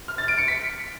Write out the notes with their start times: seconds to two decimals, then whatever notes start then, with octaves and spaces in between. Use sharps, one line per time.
0.08 F6
0.18 A6
0.28 D7
0.38 C#7
0.48 B6